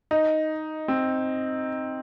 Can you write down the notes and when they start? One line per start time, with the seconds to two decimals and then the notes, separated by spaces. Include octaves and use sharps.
0.11 D#4
0.88 C4